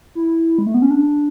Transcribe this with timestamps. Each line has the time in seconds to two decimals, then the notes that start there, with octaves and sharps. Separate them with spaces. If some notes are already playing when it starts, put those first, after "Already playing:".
0.15 E4
0.58 G#3
0.67 A3
0.74 B3
0.82 C#4
0.91 D4